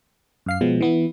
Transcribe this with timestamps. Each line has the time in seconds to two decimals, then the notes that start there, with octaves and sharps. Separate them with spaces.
0.46 F#2 F5 C7
0.61 B2 F3 G#3 B3
0.81 E3 B3 E4